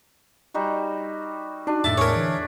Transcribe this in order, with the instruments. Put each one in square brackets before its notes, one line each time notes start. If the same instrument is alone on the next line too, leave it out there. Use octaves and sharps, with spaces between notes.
[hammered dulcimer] G3 D#4 F#4
[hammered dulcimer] D4 [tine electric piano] D#4 F#4
[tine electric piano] F2 A2 [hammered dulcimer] A4 D5 E5 [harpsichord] A5
[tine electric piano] E2 A2 [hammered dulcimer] G#4 [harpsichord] A#4 C#5
[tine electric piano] D3 E3